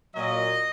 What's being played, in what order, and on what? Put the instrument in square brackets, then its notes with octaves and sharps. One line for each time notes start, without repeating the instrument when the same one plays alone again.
[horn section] A#2 F#3 D#5